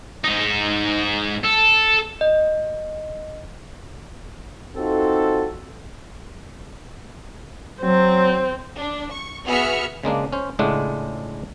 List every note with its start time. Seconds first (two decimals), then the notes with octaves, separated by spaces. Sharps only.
0.24 G#2 D#4
1.44 A4
2.21 D#5
4.76 C4 D#4 F4 F#4 A4
7.81 F#3 C4
8.77 D4
9.11 C#6
9.46 B3 F#4 G#4 E5 F6 C#7
10.04 C#3 G#3 A#3 D4
10.32 C#4 C5
10.59 C#2 A2 G#3 A3 D4 F#5